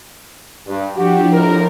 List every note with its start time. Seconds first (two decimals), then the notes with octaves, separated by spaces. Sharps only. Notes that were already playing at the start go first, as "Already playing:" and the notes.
0.67 G2
0.96 F3 D4 E4 F#4 G4
1.33 F2 A2 A#4